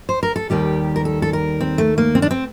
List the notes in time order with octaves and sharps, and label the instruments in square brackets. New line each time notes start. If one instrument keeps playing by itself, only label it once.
[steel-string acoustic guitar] C5
A#4
A4
D#2 D#3 G3 G4
A#4
A4
A4
A#4
C4
A3
A#3
C4
D4
C4